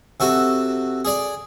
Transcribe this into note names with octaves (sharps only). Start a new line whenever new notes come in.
C3 F#4 A4
G#4 D5